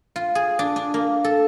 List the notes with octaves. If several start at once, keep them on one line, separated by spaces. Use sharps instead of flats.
F4
G#4
D4
D4
A#3
A4